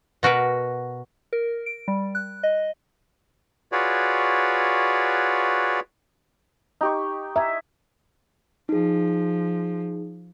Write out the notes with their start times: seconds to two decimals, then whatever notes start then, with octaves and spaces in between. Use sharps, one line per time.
0.23 B2 F#4 A#4 B4
1.33 A#4
1.66 D7
1.88 G3
2.15 F#6
2.43 D#5
3.72 F4 F#4 G#4 B4 C#5 D5
6.81 D#4 G4 C#6
7.36 E5 G#5 A#5
8.69 F3 D#4 G#4